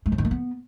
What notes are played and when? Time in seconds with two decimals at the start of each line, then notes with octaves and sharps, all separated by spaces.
0.06 G#3
0.12 F3
0.18 D#3
0.25 A#3
0.31 B3